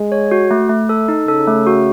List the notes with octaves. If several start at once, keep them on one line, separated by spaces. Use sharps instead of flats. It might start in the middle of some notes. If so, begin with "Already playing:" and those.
Already playing: G#3
C#5
F#4
A3
A3
A4
D#4
C#3 A4
A3
F#4